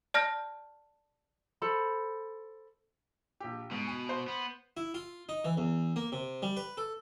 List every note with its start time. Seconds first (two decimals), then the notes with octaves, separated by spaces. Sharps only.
0.14 D5 A5 F6 G6 A#6
1.62 A4 C5 B5
3.40 A#1 G4
3.71 G#2 B2
3.87 G#5 D#7
4.09 C5
4.28 B3
4.77 E4
4.94 F4
5.29 D#4
5.44 E3
5.57 E2
5.96 A#3
6.12 C3
6.42 G3
6.56 B4
6.77 A4